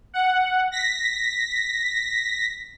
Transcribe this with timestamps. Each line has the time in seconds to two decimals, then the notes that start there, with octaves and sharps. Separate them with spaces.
0.14 F#5
0.71 A#6 B6